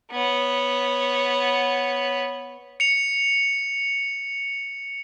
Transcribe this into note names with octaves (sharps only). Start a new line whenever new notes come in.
B3 C#5
C#7 F7